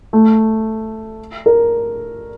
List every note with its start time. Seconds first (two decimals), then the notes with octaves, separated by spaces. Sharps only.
0.13 A3
1.46 A#4